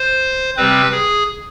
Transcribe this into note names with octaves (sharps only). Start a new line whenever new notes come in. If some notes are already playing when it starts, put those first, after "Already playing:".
Already playing: C5
C3 G3 C4 B4
G#4